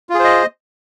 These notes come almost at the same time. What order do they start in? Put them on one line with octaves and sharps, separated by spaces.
F4 G#4 C5 D#5